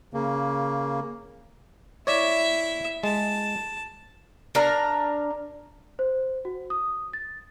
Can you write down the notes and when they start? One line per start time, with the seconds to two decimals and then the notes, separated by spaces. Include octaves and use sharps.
0.14 C#3 A#3
2.07 E4 C#5 D5 E5
3.04 G#3 A5
4.55 D4 A#4 A#5
5.99 C5
6.45 F#4
6.70 D#6
7.13 A6